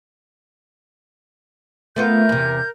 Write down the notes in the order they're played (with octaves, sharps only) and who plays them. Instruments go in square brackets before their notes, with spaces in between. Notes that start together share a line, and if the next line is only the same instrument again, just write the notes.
[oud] A3 B3 F4 [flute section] A#4 G6
[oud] E2 C3